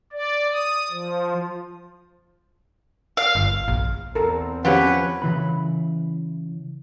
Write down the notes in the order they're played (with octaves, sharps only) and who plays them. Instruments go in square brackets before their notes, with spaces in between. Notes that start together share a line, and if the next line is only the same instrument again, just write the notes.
[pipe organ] D5
D#6
F3
[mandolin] F5
[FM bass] G1
A#1
[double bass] E2 C4 [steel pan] A4 A#4
[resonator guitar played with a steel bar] F3 C#4 C#5 [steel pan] G4 F#5 [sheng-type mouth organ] B4
[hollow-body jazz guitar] C#3 E3 B5